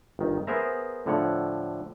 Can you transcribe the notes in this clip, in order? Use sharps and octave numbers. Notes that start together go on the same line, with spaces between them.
G1 D#3
B3 G#4 A#4 C5 E5 A#5
A2 D3 F3 C#5 F#5